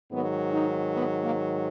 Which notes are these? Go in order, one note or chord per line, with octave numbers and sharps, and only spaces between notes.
G#2 D#3 F#3 B3
D#4
B3
A#3